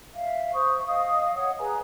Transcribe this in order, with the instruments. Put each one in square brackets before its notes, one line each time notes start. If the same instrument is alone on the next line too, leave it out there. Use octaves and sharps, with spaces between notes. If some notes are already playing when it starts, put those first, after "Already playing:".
[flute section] E5 F5
C5 C#6 D#6
D#5 F5 D#6
C#5 F#5 D#6
G#4 B4 G#5 A#5